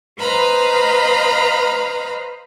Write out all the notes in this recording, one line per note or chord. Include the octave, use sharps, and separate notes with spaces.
B4 C5 D#5 F5 A#5 B5